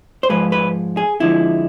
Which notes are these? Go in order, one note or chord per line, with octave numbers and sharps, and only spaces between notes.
C5
G#2 F3 G#3 B4
B4
G#4
F2 D3 F3 G#3 E4